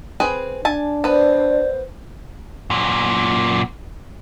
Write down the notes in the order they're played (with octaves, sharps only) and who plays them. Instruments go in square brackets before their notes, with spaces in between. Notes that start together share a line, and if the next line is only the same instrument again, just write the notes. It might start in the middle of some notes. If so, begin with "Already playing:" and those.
[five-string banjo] C4 G#4 B4
[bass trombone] D4 [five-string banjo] G#5 A5
[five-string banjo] B3 B4 [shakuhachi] C5 [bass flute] D5
[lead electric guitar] F#2 A#2